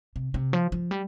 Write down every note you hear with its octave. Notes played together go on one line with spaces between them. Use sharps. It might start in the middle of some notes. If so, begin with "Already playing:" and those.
C3
C3
F3
F3
G3